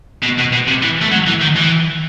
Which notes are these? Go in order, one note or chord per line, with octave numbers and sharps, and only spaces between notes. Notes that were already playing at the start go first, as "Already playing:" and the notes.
B2
B2
B2
C3
E3
A3
F#3
E3
D#3
E3